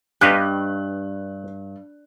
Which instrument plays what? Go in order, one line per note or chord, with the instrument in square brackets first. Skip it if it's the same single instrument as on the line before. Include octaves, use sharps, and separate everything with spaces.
[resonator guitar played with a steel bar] G2 [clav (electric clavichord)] G4 B4 D#5 [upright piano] F#6